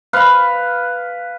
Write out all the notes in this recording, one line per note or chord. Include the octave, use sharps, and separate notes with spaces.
B4 F5